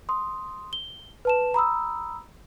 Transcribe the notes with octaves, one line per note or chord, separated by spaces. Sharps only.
C6 D#6
G7
B4 A5 E7
A#5 B5 D#6 E6